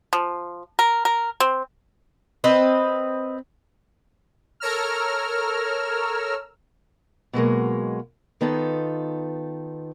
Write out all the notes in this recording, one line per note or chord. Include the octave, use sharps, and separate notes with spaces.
F3
A#4
A#4
C4
C4 B4 D#5
A4 A#4 C#5 A#5 E6 F6
B2 F#3 G#3 A#3
D#3 B3 D#4 F4 A4